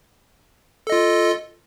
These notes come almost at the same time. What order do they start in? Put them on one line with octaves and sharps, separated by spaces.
A4 D#5 F4